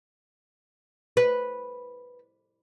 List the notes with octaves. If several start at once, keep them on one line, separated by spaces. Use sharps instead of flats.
B4